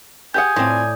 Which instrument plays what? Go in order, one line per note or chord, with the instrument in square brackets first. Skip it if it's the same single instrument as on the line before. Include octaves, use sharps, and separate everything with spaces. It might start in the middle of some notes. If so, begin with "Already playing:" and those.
[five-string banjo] G4 G#4 F#5 [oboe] G#5 [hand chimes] D#6 G6
[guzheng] A2 D5 [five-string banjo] C4 F4